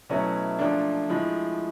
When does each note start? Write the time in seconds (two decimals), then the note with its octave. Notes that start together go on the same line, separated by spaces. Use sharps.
0.10 B2 F#3 A3 C#4 E4
0.59 A#2 F3 A3 D4
1.09 A2 F3 G#3